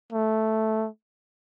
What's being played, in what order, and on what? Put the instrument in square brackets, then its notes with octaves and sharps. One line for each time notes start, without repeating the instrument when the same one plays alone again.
[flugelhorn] A3